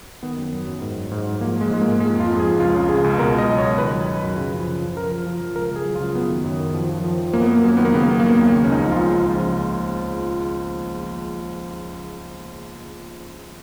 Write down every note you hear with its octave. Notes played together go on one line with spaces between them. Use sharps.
D#3 B3
F#2
F#3
F#2
G#2
F#3
G#2
G#2
F3 A#3
F3 G#3
G#2 G#3
A#3
G#2
F3 G#3
F2 F4
F2
G#4
F2
C#2 F4
C#3
C#3 G#4
C#2
B2 A#4
C#2 D#5
F#3
C#5
B2
D#3 B4
F#3
F#2
F#2
C#3
F3
C#3
F3
F3 A#4
F3
F3
F3
C#2 A#4
C#2 G#4
F#3
F4
C#3
F#2 B3
D#3
F#2
D#3
F3
F3
F3
F3
F#2 A#3
B3
F#3 A#3
B3
F#2 A#3
D#3 B3
A#3
C#3 B3
A#3
F#3 B3
F#3 A#3
B3
D#2 A#3
C#3
C#4
C#2 D#4
F3
C#2 F4
F3
F3
C#3
C#3